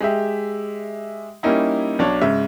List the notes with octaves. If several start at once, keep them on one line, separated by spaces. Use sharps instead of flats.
G#3 G4 E5
G3 A#3 C#4 D#4 E4
B1 D4 C#5
G#2 C#3 E5